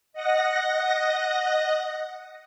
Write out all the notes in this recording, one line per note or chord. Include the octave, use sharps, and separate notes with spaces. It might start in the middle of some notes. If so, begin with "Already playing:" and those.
D#5 F#5 A#6